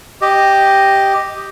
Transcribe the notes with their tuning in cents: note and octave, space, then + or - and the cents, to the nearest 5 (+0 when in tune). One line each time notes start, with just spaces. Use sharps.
G4 +0 D#5 +0